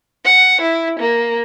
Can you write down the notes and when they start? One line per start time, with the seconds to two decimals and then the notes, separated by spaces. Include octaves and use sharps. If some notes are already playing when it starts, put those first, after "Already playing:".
0.25 F#5
0.61 E4
1.00 A#3